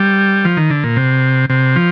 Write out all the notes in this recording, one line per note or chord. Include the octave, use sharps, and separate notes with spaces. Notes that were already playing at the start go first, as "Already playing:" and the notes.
Already playing: G3
F3
D#3
D3
A#2
C3
C3
F3